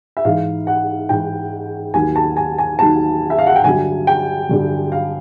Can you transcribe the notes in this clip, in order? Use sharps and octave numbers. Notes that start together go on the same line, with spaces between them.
E5
G#2 E3 F5
F#5
G#2 E3 G5
D#2 D#3 F#3 G#5
A5
G#5
G#5
D#2 D#3 F#3 A5
E5
F5
F#5
G5
G2 D3 F#3 G#5
G5
G2 D3 F#3
F5